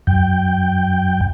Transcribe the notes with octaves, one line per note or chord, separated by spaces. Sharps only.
F#2 G5